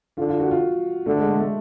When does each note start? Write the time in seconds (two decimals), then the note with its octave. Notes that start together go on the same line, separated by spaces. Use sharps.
0.18 D3 F4
0.29 F4
0.40 F#4
0.51 F4
1.06 D3 A3
1.18 G#3
1.29 A3
1.40 A3